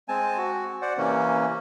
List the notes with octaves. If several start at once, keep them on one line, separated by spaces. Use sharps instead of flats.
G#3 C4 G#5 A5
F#4
C5 D5 F#5
C3 E3 A#3 C#4